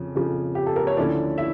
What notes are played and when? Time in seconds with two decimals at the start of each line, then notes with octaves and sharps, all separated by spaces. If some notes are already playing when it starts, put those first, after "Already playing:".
Already playing: F2 C#3 F3
0.15 F2 C#3 F3
0.55 G4
0.66 A4
0.76 A#4
0.87 C#5
0.97 D2 D3 F3 C#4 D4 E4 D5
1.38 E4 E5